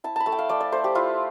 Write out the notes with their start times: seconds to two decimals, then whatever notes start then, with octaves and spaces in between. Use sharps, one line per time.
0.04 E4 A5
0.16 A5 B5
0.26 A3 A5
0.32 G5
0.39 F5
0.49 A3 D5
0.60 D5
0.72 A3 C5
0.84 G4
0.95 E4 F4